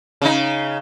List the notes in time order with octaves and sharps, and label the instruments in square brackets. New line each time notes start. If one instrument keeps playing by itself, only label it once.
[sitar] C#3 D#4